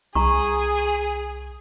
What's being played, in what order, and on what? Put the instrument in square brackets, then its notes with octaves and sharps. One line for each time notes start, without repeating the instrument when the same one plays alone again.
[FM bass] C2 [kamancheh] G#4 [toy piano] A#5 C#6